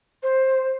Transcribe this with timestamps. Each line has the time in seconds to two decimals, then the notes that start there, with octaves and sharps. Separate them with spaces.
0.23 C5